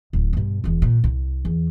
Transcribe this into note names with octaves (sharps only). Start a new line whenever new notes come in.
D1
G2 B2
E1 E2
A#2
C2
E2